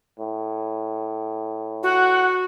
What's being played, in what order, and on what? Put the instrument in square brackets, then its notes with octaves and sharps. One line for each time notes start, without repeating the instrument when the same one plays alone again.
[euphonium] A2
[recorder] F#4 [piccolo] F#5